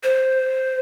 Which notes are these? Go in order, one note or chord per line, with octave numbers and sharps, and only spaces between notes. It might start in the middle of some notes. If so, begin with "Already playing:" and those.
C5